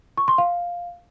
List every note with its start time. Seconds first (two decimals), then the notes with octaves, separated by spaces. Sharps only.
0.18 C#6
0.28 C6
0.38 F5